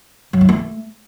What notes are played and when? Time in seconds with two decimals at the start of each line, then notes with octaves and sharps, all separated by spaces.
0.33 F#3
0.41 D#4
0.49 A3